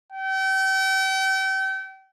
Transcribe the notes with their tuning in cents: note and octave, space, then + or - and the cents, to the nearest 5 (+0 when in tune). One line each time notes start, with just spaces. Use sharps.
G5 -35